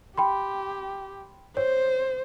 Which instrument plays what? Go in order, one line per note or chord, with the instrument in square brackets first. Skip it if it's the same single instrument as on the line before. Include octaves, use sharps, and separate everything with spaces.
[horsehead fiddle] G4 [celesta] G5 B5 C6
[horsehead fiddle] C5 [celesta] C#5